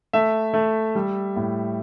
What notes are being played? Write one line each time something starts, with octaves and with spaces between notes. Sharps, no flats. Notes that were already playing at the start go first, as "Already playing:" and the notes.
A3 E5
A3
G3
A2